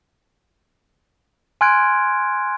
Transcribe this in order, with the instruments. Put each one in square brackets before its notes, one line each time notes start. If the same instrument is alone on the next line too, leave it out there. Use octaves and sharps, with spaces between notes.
[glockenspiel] G#5 C6 F6 F#6 G#6 D7